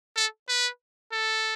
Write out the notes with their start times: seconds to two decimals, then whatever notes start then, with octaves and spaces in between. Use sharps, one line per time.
0.16 A4
0.49 B4
1.12 A4